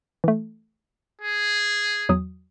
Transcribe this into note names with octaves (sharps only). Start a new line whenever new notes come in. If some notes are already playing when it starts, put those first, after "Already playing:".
E3 A3
G#4
E2 F#3 D#6